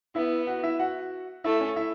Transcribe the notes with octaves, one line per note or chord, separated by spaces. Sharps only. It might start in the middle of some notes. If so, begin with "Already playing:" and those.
B3 E4 E5
F#4 F#5
E4 E5
F#4 F#5
A3 E4 E5
C#4 C#5
E4 E5